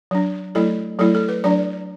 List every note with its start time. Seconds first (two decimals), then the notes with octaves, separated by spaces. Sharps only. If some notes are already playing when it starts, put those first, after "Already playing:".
0.11 F#3 D4
0.55 F#3 A3 E4 A4
0.99 F#3 A3 E4 A4
1.15 A4
1.29 B4
1.44 F#3 D4 D5